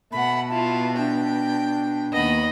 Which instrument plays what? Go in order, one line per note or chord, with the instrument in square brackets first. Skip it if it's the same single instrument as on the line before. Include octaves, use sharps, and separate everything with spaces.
[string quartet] B2 [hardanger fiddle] A3 F#5 [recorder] B5
[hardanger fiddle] E4 F4 [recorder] A5
[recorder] D4 [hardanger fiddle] G5
[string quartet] D#2 D#5 [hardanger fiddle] B3 B5